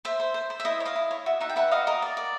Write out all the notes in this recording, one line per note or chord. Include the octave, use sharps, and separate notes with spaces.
C5 E5
C5
C5
C5
E5
E4 D#5
C#5
D#5 F5
E4
C#5
F#4 E5
D#4 E5 F#5
G5
B4 E5 F#5
F#4 D#5 F5
A#4 D#5
D5
D5